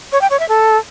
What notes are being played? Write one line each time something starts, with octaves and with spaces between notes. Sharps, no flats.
C#5
G5
C#5
E5
A4